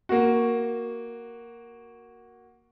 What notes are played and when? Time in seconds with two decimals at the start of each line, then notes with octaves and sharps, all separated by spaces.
0.09 A#3 F#4